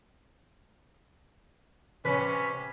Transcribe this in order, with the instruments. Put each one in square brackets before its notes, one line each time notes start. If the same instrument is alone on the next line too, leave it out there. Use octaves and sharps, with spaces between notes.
[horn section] C3 C#4 [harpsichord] B4